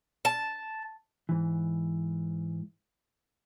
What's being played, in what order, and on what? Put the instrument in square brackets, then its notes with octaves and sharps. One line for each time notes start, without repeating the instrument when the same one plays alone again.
[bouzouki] A5
[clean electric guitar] G#2 E3